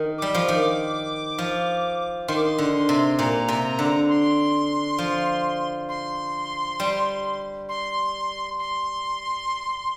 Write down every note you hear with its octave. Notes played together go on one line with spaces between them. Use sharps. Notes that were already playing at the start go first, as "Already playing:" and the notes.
Already playing: D#3
G3 D6
F3
D#3
F3
D#3 C6
D6
C6
D3
C3
A#2 A#5
C3
D3
C6
F3
C6
G3
C6
C6